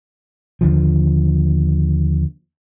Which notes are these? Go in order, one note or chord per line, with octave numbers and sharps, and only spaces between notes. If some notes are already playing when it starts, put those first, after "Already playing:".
D#2 D3 F3